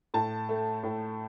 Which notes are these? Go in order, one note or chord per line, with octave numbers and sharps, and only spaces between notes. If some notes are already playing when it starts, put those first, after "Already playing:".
A2 A5
A3
A2